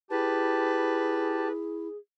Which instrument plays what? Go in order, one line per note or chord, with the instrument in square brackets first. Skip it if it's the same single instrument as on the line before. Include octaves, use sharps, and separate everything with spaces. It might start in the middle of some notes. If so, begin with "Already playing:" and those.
[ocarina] E4 [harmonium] G4 A5 [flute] G#4 [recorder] B4